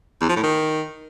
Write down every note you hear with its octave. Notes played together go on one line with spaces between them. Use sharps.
E2
F3
A2
D#3